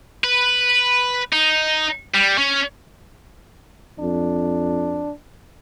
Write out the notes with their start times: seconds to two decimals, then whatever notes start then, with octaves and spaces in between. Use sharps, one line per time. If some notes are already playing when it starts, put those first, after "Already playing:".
0.24 B4
1.33 D#4
2.14 G3
2.38 C#4
3.99 F2 D4